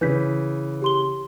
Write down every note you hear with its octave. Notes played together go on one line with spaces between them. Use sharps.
C#3 E3 B4 G6 B6
G4 C6 G7